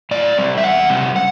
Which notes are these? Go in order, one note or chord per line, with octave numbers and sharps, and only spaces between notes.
A2 D5
G3 C4
E5
E2 F#5
C3 G3 C4
F#5